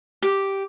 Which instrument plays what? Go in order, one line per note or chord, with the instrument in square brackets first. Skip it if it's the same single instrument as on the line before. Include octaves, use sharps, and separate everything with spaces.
[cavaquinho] G4